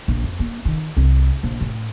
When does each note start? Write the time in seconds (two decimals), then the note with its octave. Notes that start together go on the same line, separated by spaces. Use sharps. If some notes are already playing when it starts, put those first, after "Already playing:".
0.08 A#1
0.23 F2
0.39 A#3
0.65 D#3
0.97 C2
1.43 A#1
1.61 A2